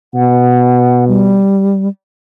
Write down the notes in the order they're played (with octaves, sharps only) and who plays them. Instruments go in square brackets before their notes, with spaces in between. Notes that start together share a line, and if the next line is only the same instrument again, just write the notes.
[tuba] B2 [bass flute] F#5
[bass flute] G3